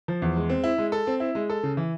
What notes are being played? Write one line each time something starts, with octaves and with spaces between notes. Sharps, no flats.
F3
E2
G#3
C4
E4
G#3
A4
C4
E4
G#3
A4
C#3
E3